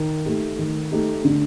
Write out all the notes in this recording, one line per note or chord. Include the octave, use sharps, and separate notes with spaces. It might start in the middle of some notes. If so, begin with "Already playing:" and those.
Already playing: D#3
A3 D#4 G4
D#3
A3 D#4 G4
D3